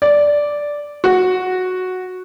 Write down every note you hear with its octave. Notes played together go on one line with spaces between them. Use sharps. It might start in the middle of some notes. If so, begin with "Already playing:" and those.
D5
F#4